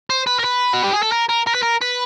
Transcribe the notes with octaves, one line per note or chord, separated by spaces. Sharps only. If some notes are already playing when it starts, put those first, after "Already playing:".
C5
B4
A#4
B4
F#4
G4
G#4
A4
A#4
A#4
A#4
B4
A#4
B4